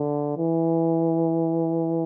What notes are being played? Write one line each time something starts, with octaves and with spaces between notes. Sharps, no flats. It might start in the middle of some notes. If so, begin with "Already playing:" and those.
Already playing: D3
E3